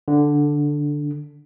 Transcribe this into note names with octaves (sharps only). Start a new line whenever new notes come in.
D3